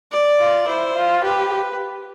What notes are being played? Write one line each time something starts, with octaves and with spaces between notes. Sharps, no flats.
D5
F4
E4 C5
F4
G4 B4